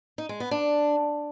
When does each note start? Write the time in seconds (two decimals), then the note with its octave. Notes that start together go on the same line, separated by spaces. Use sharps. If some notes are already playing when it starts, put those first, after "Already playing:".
0.18 D#4
0.29 G#3
0.40 B3
0.51 D4